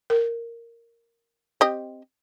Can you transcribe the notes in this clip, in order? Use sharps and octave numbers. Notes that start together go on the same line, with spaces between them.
A#4
C4 G4 D#5